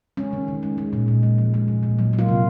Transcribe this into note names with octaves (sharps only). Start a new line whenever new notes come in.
G#3 C#4
D#3
D#3
G#3
G#3
A#2
A#2
G#3
F3
G#3
A#2
A#2
F#3
A#3
F4
C3